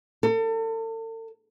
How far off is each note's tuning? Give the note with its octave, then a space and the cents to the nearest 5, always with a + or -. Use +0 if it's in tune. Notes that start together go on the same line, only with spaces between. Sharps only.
A4 +40